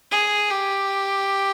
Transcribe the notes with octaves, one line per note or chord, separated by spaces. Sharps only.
G#4
G4